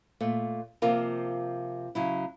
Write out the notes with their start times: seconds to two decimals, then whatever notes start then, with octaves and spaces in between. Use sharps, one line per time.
0.21 A#2 A3
0.82 C3 F3 A#3 F4 A#4
1.95 C#3 F#3 E4